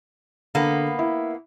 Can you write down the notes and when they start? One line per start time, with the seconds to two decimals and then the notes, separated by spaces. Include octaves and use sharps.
0.55 D3 A#3 B3
0.99 E4